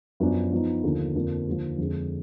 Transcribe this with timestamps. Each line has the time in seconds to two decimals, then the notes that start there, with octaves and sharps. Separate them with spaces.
0.20 F#2 F3 B3 D4
0.52 F3 B3 D#4
0.83 D#2 D3 F3
1.15 F2 D3 F3 A#3 D4
1.47 D#2 D3 F3
1.78 F2 D3 G#3